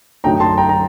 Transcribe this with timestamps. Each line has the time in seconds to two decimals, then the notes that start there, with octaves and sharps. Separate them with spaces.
0.24 F#2 D3 F#3 A3 D#4 G5 A#5
0.40 A5 C6
0.58 G5 A#5
0.69 A#5